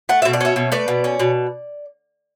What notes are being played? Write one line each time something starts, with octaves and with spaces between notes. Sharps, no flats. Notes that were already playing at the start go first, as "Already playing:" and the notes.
A3 F#5
B2 E5
D5
C#4 C#5 E5
B2
A3 B4 D5
B2
C#4
B2